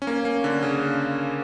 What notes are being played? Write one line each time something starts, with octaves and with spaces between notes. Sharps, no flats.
C#4
A#3
A#3
D3
C#3